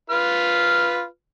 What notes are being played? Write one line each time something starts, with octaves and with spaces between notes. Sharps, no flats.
F4 B4 F6